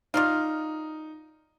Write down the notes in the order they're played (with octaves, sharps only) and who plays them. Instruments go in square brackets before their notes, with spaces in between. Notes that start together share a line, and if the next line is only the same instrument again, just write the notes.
[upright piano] D#4 [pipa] F4 D5 F5